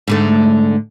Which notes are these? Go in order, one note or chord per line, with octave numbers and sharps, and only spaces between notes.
G#2 D3 A3